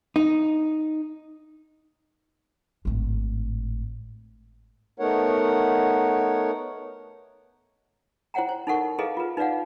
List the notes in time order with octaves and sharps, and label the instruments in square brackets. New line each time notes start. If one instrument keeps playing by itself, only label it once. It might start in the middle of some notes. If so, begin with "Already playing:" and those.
[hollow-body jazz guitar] D#4
[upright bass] G#1 A2
[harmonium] A3 B3 D#4 A#4 C#5 F#5
[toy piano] E4 C5 C#5 F#5 G5 A#5
C5 C#5
D#4 E4 A4 A#4 F#5 C#6
E4 G#4 A4 B4 D#5 F5
F4 B4
D#4 B4 D5 F5 F#5